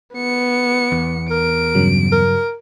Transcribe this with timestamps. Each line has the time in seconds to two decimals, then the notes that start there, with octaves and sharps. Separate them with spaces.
0.14 B3 C#7
0.92 E2
1.31 A#4 D7
1.75 G2 C#3 F#3
2.12 A#4